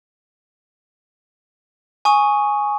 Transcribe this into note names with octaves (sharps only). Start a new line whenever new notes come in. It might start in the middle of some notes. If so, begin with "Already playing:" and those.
G#5 C#6 D#6